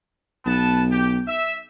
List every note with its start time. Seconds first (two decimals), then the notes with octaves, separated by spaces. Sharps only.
0.46 B1 B3 A5
0.91 G4
1.28 E5